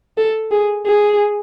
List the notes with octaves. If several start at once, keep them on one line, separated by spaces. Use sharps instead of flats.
A4
G#4
G#4